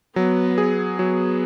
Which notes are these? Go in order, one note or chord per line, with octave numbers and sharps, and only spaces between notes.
F#3 B3
G#4
F#3 B3